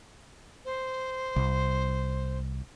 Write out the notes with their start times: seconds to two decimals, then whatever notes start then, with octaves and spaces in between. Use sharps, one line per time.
0.65 C5
1.36 C2